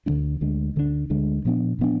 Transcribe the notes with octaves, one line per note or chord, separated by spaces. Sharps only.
D2 D3 G#3 D4
D2 D3 G#3 D4
D2 D3 G#3 D4
D2 D3 G#3 D4
A#2 F3 B3 D4
A#2 F3 B3 D4